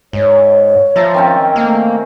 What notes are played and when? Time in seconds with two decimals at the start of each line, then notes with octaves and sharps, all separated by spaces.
0.13 G#2 C#5
0.96 F3 E5 A5 A#5
1.14 D#3 C4 C#4
1.56 A3 A#3